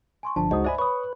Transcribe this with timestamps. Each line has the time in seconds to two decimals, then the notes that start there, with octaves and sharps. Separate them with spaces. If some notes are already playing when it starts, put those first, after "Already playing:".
0.23 G#5 C6 C#6
0.36 G1 F3 D4 A5
0.51 C#2 G#3 D#4 F#4 C5 D#5 D#6
0.64 C5 D5 E5 G#5 B5
0.79 B4 C#5 B5 C#6 D#6